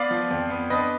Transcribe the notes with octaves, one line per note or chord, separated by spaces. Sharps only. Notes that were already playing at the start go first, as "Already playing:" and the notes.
Already playing: B3 D5 F5
F3
F2
B3
D4 B4 D#5